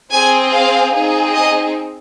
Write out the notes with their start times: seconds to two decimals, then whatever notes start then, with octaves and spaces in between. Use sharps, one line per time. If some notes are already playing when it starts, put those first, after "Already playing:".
0.12 C4 G#4 G#5
0.53 F5
0.94 C4 D#4 G#4
1.34 D#5